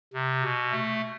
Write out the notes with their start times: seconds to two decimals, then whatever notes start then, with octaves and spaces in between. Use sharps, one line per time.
0.14 C3
0.43 B2
0.71 A3